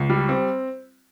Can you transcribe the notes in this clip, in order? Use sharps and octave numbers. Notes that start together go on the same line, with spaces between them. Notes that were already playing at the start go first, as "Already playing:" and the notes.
Already playing: C#2
G3
C4